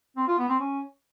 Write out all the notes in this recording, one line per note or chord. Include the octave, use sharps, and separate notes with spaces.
C4
F4
B3
C4
C#4